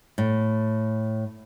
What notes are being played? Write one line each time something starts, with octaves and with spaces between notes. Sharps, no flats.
A2